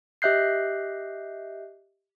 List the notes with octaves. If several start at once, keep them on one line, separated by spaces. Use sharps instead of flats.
G4 D#5 E5 F#6 G6 C7